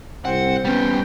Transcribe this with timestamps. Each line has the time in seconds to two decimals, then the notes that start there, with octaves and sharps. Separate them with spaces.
0.25 C2 C4 F#5
0.65 G3 B3 C#4 G5